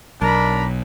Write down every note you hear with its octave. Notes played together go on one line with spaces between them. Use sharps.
B1 D4 A#4 A#5 B5